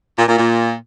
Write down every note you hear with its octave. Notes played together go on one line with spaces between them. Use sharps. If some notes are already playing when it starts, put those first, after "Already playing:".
A#2
A#2
A#2